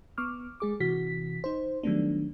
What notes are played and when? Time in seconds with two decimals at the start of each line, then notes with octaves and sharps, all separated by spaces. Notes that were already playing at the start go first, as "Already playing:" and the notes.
0.18 B3 C#6 D6 F6
0.60 G#3 G#4 D6
0.80 C3 E3 F#4 B6
1.44 D#4 C5
1.83 D#3 F#3 G3 A3 B3 D4